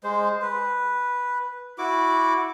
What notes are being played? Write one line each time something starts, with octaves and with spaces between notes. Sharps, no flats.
G#3 C5
B4
E4 F#4 D6